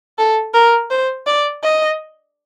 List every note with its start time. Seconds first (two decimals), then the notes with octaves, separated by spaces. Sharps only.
0.18 A4
0.54 A#4
0.91 C5
1.27 D5
1.63 D#5